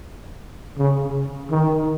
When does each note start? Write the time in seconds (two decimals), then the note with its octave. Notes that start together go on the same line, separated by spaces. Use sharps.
0.78 C#3
1.51 D#3